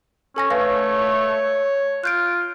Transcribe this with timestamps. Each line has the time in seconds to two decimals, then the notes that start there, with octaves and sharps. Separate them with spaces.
0.36 C#4 A4 G#5 A#6
0.50 A3 B4 C#5 F5 A#6
2.04 F4 F#6 G6 D7